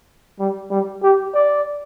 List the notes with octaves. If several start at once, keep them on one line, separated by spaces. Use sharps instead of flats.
G3
G3
G4
D5